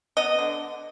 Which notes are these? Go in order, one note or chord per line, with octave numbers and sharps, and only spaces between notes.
B3 D#5
D3